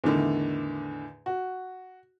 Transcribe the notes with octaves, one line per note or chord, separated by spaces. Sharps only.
E2 A2 D3 D#3
F#4